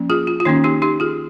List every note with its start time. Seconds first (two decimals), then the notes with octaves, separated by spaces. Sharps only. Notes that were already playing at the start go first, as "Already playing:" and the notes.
Already playing: F3 A#3 C#4
0.10 F4 G#4
0.27 F4
0.40 F4
0.45 D#3 A#3 C#4 D#4
0.64 D#4 G4
0.82 D#4 G4
1.00 F4 G#4